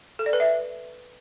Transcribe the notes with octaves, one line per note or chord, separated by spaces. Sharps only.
A4
D5
B4
E5